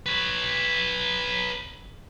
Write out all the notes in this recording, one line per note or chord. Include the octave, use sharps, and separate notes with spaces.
B4 C#5